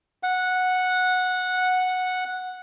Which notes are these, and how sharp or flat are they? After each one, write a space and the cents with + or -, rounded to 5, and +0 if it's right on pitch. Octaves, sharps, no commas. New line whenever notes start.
F#5 -10